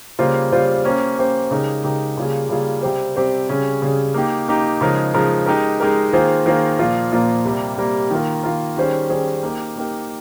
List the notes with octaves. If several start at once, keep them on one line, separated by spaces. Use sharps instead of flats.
C#3 G3 A#3 F4 C5
C#3 G3 A#3 F4 C5
A#3 C#4 G4 C5
A#3 C#4 G4 C5
C#3 G#3 D#4 G4 A#4
C#3 G#3 D#4 G4 A#4
C#3 G3 A#3 F4 G#4
C#3 G3 A#3 F4 G#4
C3 G3 C4 G4 C5
C3 G3 C4 G4 C5
C#3 G3 C#4 G#4
C#3 G3 C#4 G#4
A#3 D#4 G4
A#3 D#4 G4
C#3 F3 G#3 D#4 A#4
C#3 F3 G#3 D#4 A#4
G#3 D#4 G4 A#4
G#3 D#4 G4 A#4
D#3 A#3 F4 G#4 C5
D#3 A#3 F4 G#4 C5
A#2 F3 A#3 F4 A#4
A#2 F3 A#3 F4 A#4
C3 G3 A#3
C3 G3 A#3
D#3 A#3 F4 A#4
D#3 A#3 F4 A#4
D#3 G3 C#4 G#4 C5
D#3 G3 C#4 G#4 C5
A#3 D#4 G4 A#4
A#3 D#4 G4 A#4